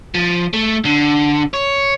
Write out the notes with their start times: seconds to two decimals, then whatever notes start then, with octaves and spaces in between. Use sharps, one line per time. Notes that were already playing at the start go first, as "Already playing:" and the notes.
0.15 F3
0.53 A3
0.85 D3
1.54 C#5